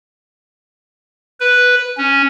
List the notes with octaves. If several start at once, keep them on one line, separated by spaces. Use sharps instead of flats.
B4
C#4